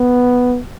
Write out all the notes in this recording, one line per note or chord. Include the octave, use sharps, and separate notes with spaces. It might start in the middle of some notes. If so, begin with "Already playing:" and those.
Already playing: B3